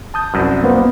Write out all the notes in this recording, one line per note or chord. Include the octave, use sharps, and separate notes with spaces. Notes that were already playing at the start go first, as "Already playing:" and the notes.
A5 D#6 G6
C2 F#2
A#3 B3 C5